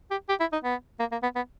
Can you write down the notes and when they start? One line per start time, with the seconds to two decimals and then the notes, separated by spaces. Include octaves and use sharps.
0.11 G4
0.29 G4
0.40 E4
0.53 D#4
0.64 B3
1.00 A#3
1.12 A#3
1.23 B3
1.36 B3